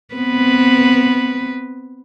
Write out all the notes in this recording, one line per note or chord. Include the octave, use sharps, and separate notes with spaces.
B3 C4 B4